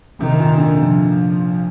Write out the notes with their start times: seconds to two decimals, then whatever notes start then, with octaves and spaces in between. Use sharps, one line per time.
0.20 C3 D#3
0.40 A#2
0.57 D3
0.77 C3 F3